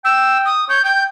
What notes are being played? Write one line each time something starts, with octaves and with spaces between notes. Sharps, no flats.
G5 E6
D#6
C#5 G6
G5 G6